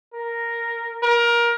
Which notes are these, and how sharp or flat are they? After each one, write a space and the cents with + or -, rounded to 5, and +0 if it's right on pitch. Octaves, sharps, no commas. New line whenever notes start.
A#4 +0
A#4 +20